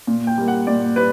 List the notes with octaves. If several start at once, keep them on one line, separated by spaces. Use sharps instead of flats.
A#2
G5
G3 A#3
F#5
A#2 D5
G3 B4